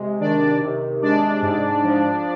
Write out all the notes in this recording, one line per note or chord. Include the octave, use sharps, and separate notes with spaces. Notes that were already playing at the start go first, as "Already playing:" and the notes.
Already playing: C3 G#3
D#3 D4 D5
C3
G#3 D4 D5
G#2
F3